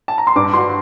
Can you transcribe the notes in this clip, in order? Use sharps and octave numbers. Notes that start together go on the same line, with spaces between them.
A5
A#5
C6
G2 D6
F#4 C6